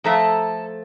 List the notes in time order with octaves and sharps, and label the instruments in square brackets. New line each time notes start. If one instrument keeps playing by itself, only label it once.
[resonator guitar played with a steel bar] F3 A3 E5 [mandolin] A4 A#5